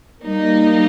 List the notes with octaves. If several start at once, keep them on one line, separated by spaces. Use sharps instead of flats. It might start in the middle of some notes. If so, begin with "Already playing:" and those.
G3 A#3 D#4